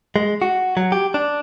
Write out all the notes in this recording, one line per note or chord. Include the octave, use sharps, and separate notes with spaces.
G#3
F#4
F#3
G4
D4